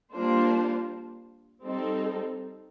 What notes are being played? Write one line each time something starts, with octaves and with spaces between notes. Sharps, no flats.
G3 A#3 D4 F4 C5
G3 C4 D#4 A4